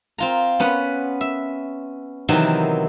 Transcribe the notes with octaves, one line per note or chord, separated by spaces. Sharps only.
C4 F4 A#5
B3 C#4 B4 F#5
E5
C3 D#3 E3 F#3 B3 C4